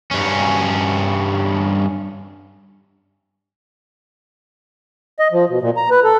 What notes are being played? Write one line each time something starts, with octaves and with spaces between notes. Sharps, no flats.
G2 C#4
D#5
F3
B2
A#2
A#5
B4
A4